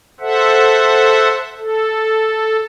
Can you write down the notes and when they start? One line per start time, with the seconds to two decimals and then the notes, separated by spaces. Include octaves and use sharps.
0.20 A4 C5 E5 F#5
1.57 A4